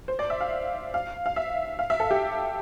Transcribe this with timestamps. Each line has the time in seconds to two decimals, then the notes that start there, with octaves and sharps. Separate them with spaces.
0.08 C5
0.19 D5
0.30 E5
0.41 F5
0.94 F5
1.26 F5
1.36 E5
1.79 F5
1.90 E5
2.00 A4
2.11 G4